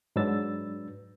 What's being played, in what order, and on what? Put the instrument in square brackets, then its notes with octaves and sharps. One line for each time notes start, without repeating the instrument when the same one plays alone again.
[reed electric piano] G#2 F#3 D4 B4 E6 A6